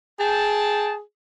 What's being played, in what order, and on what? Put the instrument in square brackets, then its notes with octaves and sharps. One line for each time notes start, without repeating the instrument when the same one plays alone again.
[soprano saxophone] G#4 [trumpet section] G5 A5